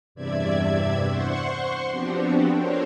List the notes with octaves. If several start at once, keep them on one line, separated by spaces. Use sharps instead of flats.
E2 G2 C3 D5 E5 G#6
C5 F#5 C6 C#6
F3 B3 C4 D4 F#4 G4
D4 A4 A#4 C5 C#5